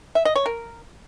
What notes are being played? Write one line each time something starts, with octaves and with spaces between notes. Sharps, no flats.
E5
D#5
C#5
A#4